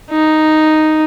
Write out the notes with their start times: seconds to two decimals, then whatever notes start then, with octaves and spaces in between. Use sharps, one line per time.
0.10 D#4